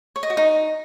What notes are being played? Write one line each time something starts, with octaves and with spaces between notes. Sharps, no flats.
C#5
D#5
F#4
D#4